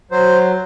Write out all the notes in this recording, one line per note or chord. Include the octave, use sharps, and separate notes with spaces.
F#3 C5